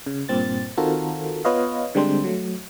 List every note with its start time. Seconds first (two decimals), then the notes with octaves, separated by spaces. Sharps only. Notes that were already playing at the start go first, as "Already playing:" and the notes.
0.06 C#3
0.29 G2 A#2 C4 A6
0.77 D#3 C4 F4 F#4 A4 A#4
1.45 B3 F4 B4 C#5 D#5 F5
1.95 D3 G3 G#3 C4 D4 C5
2.24 F#3 A3